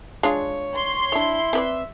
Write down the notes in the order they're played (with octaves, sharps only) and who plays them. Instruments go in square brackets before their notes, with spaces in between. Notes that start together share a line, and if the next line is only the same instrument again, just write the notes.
[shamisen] G#3 D4 F4 [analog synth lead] C#5
[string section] C6
[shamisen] D4 C#5 [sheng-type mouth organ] E4
[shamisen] C4 B4 D5 [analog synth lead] E5